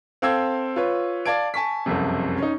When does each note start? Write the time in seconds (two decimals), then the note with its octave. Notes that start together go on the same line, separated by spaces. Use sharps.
0.22 C4 A4 F5 G5 E6 G#6
0.76 F4 B4 C#5
1.26 D5 F5 A5 G#6 D7
1.54 G#5 A5 C#6 B6
1.86 F#1 C2 F2 C3
2.38 C#4 D#4